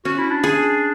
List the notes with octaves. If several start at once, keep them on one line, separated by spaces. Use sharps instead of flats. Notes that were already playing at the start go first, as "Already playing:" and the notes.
C#4 F#4
E4
D4
G#4